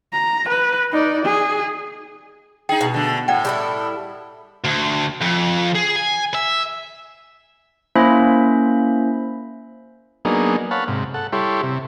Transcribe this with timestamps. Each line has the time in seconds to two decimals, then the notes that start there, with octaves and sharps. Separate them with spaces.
0.13 A#5
0.48 B4
0.92 D#4 D5
1.25 G#4
2.69 D#4 G#4 G5
2.81 B2
2.94 D3 A3
3.28 A2 D5 F#5 G5
3.45 G3 E4 A4
4.65 D2
5.21 F2
5.75 G#4
5.96 G#5
6.35 E5
7.96 A#3 C#4 E4 C5 E5 B5
10.25 F#3 A#3 B3 D4 D#4 G#4
10.71 C#5 F5 F#5 A5 B5
10.88 G#2 C3
11.14 A4 F#5
11.32 G3 E4 G4 A4 C#5 C6
11.63 C3